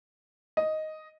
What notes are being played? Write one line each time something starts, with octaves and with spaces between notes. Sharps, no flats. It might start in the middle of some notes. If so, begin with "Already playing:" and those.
D#5